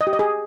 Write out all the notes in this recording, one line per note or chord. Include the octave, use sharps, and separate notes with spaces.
D#5
G4
D#5
G#4